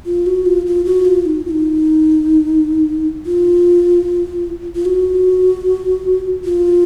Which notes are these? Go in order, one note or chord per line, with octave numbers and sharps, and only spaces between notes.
F4
F#4
F4
F4
F#4
F4
D#4
F4
D#4
F4
F4
F#4
F4